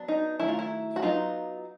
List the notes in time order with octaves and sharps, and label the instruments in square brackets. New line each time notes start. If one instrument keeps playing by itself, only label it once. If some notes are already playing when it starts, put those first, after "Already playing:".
Already playing: [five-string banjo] F#3 B3 D4
D#4
D#3 F#3 A3 E4
F4
E4
F#4
F#3 B3 D#4 F4